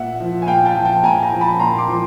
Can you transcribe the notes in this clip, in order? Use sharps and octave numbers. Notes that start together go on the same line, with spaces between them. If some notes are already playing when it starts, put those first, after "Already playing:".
Already playing: A#2 E5 F#5
F3
G#5
A#2 F5 G5
G5 A5
F3
G5 A5
A#2 G#5 A#5
G#5 A#5
F3
A5 B5
A#2 A#5 C6
C6 D6
F3